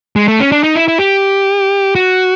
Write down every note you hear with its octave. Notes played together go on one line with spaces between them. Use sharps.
G#3
A3
C#4
D4
D#4
E4
E4
G4
F#4